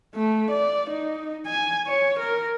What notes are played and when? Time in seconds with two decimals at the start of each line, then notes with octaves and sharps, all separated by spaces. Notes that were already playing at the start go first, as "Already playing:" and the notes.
0.15 A3
0.50 D5
0.90 D#4
1.46 G#5
1.86 C#5
2.19 A#4